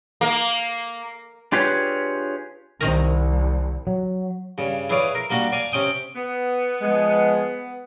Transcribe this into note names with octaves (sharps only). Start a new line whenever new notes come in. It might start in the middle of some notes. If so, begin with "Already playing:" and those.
A#3
D4 F4 G4 G#4 B4 C#5
C2 C3 D#3 A#4
F#3
G2 C#3
E4 G#4 B4 C#5 D5 F5
A#4
G3 A#3 D4 F#4
D5 F5 G#5
C3 C#4 G5 D#6
B3
F3 G#3